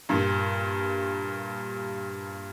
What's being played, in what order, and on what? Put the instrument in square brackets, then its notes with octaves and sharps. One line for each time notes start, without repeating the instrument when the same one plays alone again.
[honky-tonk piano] G2 A#2